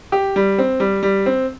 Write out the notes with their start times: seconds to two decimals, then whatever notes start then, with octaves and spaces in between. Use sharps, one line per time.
0.12 G4
0.36 G3
0.58 C4
0.80 G3
1.03 G3
1.26 C4